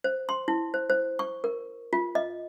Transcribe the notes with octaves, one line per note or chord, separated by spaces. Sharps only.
C5
C6
E4
C5
C5
C#6
A#4
F4
D#5